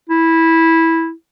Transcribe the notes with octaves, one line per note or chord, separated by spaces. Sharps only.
E4